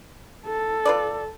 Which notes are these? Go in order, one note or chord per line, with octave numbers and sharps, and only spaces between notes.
A4
F4 B4 D5